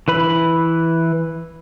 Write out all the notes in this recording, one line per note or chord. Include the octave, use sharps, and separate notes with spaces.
E3 B4 B5